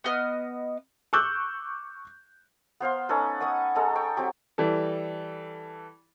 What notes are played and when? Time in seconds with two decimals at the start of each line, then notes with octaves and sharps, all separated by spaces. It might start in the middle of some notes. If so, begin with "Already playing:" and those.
0.04 B3 D#5 F6
1.13 C#6 D6 E6 F#6 G6
2.80 B3 C5 F5 C6
3.09 C#4 D#4 A4 B4
3.40 D#5 F#5 C#6 D#6
3.75 G#3 A4 A5 A#5
3.95 G5 C#6
4.17 F#3 C4 G4
4.58 E3 G3 A4